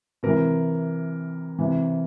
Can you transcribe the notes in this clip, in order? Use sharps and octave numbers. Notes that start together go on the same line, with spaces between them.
C3 E3 A#4
C3 E3